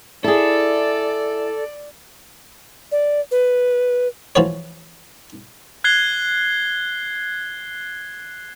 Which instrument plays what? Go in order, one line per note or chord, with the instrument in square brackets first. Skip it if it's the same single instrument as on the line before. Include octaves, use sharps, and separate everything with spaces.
[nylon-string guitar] E4 G#4 [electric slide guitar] A4 [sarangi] D5
[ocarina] D5
B4
[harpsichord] E3 F3 F#4 B4 C#5
[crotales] F#6 G#6 C7 G7